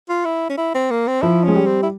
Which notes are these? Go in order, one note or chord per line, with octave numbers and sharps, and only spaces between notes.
F4
E4
C#4
E4
C4
A#3
C4
F3 E4
G#3 C#4
G3
C4
E4